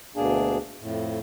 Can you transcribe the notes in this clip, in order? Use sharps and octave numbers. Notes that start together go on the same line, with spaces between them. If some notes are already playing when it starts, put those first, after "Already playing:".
D2 B2 A#3 D4 G#4
F2 A2